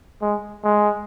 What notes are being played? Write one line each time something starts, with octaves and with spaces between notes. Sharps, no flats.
G#3
G#3